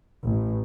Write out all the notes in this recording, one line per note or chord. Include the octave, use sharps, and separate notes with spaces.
A1